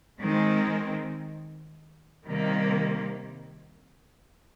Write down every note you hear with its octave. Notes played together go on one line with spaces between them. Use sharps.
D#3 G#3 C4
C3 D#3 G3 A#3